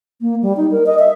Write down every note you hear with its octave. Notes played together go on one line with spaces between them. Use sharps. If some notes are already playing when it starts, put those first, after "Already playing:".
A#3
G3
D#4
A#4
D#5
E5